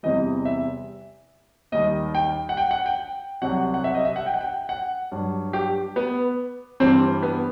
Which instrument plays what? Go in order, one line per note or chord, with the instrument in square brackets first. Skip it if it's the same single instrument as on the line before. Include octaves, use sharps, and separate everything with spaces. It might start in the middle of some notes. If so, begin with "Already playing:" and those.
[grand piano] E2 C3 E3 G3 D#5
E5
D#2 D#3 G3 D#5
G5
F#5
G5
F#5
G5
C2 C3 F#3 F#5
F#5
E5
D#5
E5
F#5
G5
F#5
G5
F#5
G2 F#3
G4
B3
G2 E3 G3 C4
B3